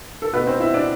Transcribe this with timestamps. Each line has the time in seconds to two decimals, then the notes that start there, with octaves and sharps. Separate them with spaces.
0.22 A4
0.33 B2 A3 B3 B4
0.47 C4 C5
0.60 E4 E5
0.74 D4 D5